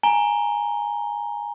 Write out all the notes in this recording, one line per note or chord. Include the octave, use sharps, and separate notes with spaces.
G#5 A#5 G7